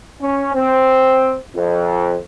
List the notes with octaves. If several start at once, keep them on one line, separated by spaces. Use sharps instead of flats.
C#4
C4
F2